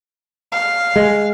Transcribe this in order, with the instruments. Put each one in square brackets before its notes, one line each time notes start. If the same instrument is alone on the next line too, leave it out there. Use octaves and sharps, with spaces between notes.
[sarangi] F5
[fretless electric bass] G#3